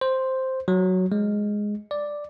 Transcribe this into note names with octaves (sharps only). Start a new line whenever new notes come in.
C5
F#3
G#3
D5